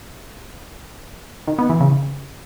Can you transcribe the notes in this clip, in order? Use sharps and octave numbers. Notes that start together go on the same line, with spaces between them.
D#3
B3
E3
C#3